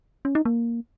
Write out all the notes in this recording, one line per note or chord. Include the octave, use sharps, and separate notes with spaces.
C#4
D#4
A#3